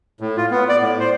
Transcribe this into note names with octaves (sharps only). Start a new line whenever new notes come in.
A2
F4
B3
D5
A2
C5